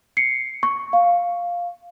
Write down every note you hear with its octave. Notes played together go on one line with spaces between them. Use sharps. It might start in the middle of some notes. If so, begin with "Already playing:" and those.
C7 C#7
C#6
F5